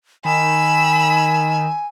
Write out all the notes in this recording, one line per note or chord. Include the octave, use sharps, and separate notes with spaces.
D#3 G#5 B5 E6